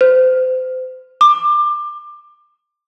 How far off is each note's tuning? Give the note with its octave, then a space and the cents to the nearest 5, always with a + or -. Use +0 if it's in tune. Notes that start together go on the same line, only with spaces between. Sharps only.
C5 -30
D6 +25